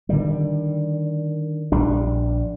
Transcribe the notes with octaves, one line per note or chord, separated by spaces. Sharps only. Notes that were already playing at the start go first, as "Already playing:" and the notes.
D3 D#3 G3
A#1 G3 D4